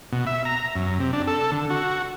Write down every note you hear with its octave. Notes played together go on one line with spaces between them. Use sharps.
B2
E5
A#5
F#2
C3
D4
A4
D3
F#4